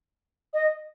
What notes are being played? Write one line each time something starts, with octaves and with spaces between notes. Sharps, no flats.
D#5